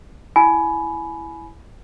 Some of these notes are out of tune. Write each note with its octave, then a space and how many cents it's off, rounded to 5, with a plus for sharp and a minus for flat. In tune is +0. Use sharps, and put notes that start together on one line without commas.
E4 +0 G#5 +20 B5 +0